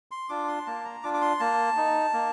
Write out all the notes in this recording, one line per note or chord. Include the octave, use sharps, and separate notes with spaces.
C6
D4 F4 D6
C6
A#3 A5
A#5
D4 F4 D6
D6
C6
A#3 A5
D#4
A#3